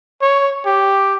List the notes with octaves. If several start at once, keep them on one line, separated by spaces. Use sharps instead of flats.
C#5
G4